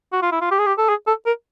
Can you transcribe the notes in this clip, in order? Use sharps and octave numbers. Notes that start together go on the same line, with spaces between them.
F#4
F4
E4
F4
G4
G#4
G4
A4
G#4
A4
A#4